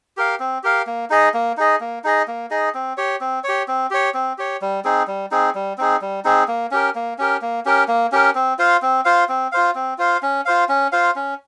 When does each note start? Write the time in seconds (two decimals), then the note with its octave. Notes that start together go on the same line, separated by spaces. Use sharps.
0.17 G4 A#4 F5
0.40 C4
0.63 G4 A#4 F5
0.87 A#3
1.10 D#4 G#4 D#5
1.34 A#3
1.57 D#4 G#4 D#5
1.80 A#3
2.04 D#4 G#4 D#5
2.28 A#3
2.50 D#4 G#4 D#5
2.75 C4
2.97 G4 C#5
3.21 C4
3.44 C#5
3.49 G4
3.68 C4
3.90 G4 C#5
4.14 C4
4.38 G4 C#5
4.61 G3
4.84 C4 D#4 G#4
5.07 G3
5.31 C4 D#4 G#4
5.55 G3
5.78 C4 D#4 G#4
6.01 G3
6.25 C4 D#4 G#4
6.48 A#3
6.71 C#4 G4 A#4
6.95 A#3
7.18 C#4 G4 A#4
7.42 A#3
7.66 C#4 G4 A#4
7.88 A#3
8.12 C#4 G4 A#4
8.35 C4
8.58 F4 C5 F5
8.82 C4
9.05 F4 C5 F5
9.29 C4
9.52 F4 C5 F5
9.75 C4
9.98 F4 C5 F5
10.22 C#4
10.45 F4 C5 F5
10.69 C#4
10.92 F4 C5 F5
11.16 C#4